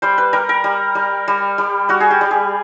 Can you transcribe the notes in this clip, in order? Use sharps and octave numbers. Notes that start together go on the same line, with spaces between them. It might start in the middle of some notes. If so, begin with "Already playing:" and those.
G3 C5
B4
G3 A#4
A#4
G3
G3
G3
G3
G3 F#4
G#4
G4
G3
G#4